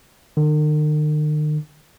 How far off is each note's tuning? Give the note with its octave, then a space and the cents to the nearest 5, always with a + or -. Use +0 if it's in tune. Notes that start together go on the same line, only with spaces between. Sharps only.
D#3 -45